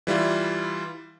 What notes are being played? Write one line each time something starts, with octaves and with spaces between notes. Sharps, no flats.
E3 G3 E4 F4